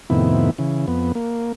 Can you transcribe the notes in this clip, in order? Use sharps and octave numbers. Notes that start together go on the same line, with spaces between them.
F2 A2 C3 D#3 B3 E4
C#3 E3
F2 B3
A#3